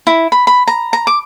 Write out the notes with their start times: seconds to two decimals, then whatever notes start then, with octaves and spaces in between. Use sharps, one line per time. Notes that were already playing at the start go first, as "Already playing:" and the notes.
0.07 E4
0.32 B5
0.47 B5
0.68 A#5
0.93 A#5
1.07 D6